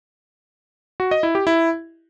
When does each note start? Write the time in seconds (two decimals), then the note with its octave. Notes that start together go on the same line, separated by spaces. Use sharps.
1.00 F#4
1.11 D#5
1.23 E4
1.35 G4
1.47 E4